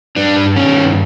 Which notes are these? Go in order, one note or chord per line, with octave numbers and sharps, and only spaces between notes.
G2 D4
G2
D#3 C#4
G2